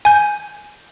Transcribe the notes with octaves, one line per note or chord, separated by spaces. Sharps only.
G#5 G6